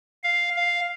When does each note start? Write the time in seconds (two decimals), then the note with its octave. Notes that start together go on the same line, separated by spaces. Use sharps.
0.24 F5
0.56 F5